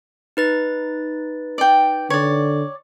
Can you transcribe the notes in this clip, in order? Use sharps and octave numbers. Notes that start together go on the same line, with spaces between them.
D#4 B4 A6
D5 G5
D3 C#5 D5